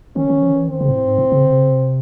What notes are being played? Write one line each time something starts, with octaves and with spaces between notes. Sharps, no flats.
D#3 C#4
D#3
F3
D#3
E3
D#3 C4
C#3
G#2
A2
G#2
A2
C#3
D3
C3
C#3
C3